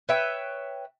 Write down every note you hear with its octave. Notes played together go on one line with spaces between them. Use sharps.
B4 C#5 E5 G5